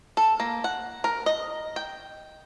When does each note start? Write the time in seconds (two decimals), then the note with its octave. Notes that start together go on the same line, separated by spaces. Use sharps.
0.17 A4
0.40 A#3
0.64 F#5
1.04 A#4
1.26 D#5
1.76 G5